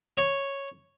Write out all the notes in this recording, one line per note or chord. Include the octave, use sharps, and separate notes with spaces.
C#5